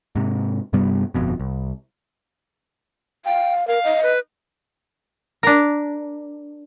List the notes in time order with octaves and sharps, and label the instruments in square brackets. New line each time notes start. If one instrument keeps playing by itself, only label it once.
[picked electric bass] G#2 C3
G2 C3 G3 B3
G1 F2 B2
C2
[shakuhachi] F5 [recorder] G5
[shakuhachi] A#4 [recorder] F5
[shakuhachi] D#5
[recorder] B4
[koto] D4 A#4